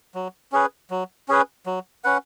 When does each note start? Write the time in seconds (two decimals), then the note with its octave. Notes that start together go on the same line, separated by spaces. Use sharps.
0.15 F#3
0.52 C#4 G#4 B4
0.90 F#3
1.28 C#4 G#4 B4
1.66 F#3
2.04 C#4 B4 F#5